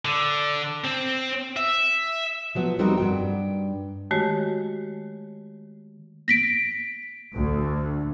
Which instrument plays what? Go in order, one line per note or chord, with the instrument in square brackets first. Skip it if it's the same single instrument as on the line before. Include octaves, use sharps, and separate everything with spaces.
[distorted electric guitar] D3
C4
E5
[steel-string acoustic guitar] F3 F#3 B3
F2 G3 C4 D#4 F#4 A#4
G2 D#3 G5
[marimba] D#3 G#3 A3 F#4 G4 C#5
[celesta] A#6 B6 D7
[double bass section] D2